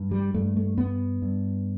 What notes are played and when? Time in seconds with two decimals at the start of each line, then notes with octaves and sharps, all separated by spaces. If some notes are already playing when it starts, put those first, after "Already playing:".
Already playing: G2
0.11 G3
0.34 G2 A3
0.57 A3
0.78 G2 B3
1.22 G2